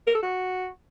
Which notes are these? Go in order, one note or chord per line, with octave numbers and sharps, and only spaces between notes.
A#4
A4
F#4